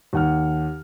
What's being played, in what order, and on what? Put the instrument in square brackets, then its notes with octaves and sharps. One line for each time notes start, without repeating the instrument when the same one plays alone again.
[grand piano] D#2 F#5 F6